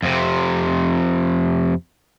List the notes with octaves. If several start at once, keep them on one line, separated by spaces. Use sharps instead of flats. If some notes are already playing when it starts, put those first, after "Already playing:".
F2 C3